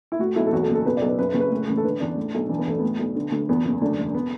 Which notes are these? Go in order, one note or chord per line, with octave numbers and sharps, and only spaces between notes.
E4
A2 F#4
B1 E4
A4
E2 F#4
A4
F#1
A4
B2 B4
D5
B1
B4
F#2 B4
B4
F#1
B4
A2
A1
A4
D3 B4
E2 D4
A2
B1
E3 D4
B3
E2 A3
A2 B3
B1
D3
D2
E2 B3
F#1
D2 D4
E1
B3